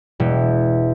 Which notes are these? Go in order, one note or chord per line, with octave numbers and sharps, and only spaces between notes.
E1